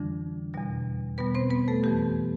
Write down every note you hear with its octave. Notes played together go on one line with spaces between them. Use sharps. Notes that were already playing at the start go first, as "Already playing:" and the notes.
Already playing: F2 D3 E3 G3 D4
E2 B2 G3
B2 G3 B3 B4
C4 C5
B3 B4
A3 A4
F2 E3 G3 G4